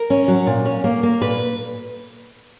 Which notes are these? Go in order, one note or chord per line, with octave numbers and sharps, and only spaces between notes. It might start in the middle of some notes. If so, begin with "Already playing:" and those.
Already playing: A#4
C#4
F#3
A#2
C#4
A#3
A#3
A#2 B4